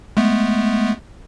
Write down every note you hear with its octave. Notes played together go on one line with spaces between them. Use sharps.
G#3 A3 B3